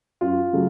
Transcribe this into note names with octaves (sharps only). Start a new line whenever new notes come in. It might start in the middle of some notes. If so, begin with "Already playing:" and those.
F#2 F4
C#3 F#3 A3